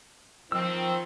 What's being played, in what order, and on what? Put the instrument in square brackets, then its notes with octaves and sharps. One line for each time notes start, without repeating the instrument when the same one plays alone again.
[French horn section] D#3 C4 [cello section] F3 [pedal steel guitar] E6